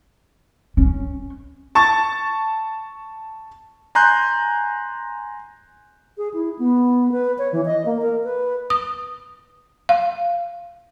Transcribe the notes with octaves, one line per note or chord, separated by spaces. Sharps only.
C#4
A5 C#6 A6
G#5 A#5 C6 F#6 G6
G#4
E4
B3
B4
C#5
E3
D#5
A#3
A#4
B4
D#6
F5